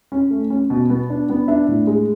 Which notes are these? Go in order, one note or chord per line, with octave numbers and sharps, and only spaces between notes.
C#4
A3
C#4
B2
B3
D4
B3
D4 E5
A2
G#3